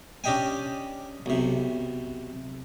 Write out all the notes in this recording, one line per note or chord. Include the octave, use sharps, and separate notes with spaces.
C#4 D4 G4 D#5 G5 G#5
B1 C3